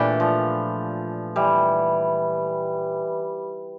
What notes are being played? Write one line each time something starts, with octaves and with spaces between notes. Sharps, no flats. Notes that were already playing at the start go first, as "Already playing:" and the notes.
Already playing: A#2 E3 A3 D4 G4
F3
E3 G3